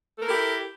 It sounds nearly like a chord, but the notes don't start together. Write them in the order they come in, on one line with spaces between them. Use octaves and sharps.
A4 A#4 E4 G4